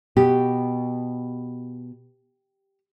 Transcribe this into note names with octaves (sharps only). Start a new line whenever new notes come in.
B2 G4